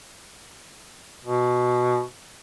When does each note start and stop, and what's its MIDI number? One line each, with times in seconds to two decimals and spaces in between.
1.25 2.02 47